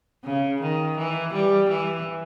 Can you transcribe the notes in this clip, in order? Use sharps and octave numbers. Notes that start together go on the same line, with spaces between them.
C#3
D#3
E3
G3
E3